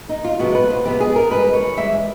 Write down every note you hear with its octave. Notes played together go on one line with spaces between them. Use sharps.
D#4
F4
C3 F3 G#3 B3 F#4
B4
C5
C3 F3 G#3 B3 G4
G#4
A#4
G2 E3 G#3 B4
C#5
G2 E3 G#3 E5